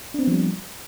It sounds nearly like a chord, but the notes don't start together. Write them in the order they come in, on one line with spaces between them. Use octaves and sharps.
D4 C4 B3 F3 G3